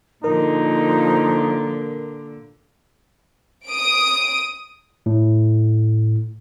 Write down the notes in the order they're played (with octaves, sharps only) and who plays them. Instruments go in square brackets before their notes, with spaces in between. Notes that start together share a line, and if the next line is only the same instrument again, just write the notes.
[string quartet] A#2 D3 [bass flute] F3 [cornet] D#4 [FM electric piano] A#4
[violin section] D#6 D7
[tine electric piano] A2